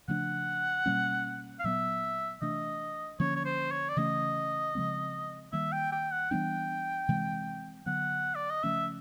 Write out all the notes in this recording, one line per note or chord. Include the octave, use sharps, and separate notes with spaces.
C#3 F3 A3 D4 F#5
B2 G3 A#3 C#4
F5
A#2 F#3 B3 E5
C3 E3 A3 D4 D#5
D3 F3 A#3 C#4 C#5
C#5
C5
C#5
D5
C#3 E3 A3 C#4 D#5
C#3 F3 G#3 C4
D#3 G3 A#3 E5
G5
G5
F#5
E3 G3 B3 D4 G5
C3 E3 G#3 C4
D3 F#3 B3 F#5
D5
D#5
C#3 F3 A3 C#4 E5